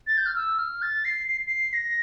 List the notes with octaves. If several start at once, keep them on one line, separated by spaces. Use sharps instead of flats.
A6
G6
F6
E6
F6
A6
C7
C7
C7
A#6